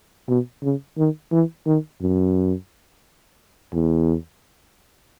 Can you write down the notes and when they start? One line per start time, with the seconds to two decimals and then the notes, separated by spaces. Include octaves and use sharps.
0.29 B2
0.63 C#3
0.98 D#3
1.32 E3
1.67 D#3
2.01 F#2
3.74 E2